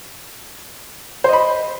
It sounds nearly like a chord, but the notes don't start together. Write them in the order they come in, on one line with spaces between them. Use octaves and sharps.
C5 D#5 B5